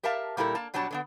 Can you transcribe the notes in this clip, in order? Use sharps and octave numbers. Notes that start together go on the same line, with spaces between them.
G4 A#4 E5 F5 A5
A#2 G3 E4 A4 A#4
A#3 A5
B2 F#3 G3 D4 C#5 A5
D3 G#3 B3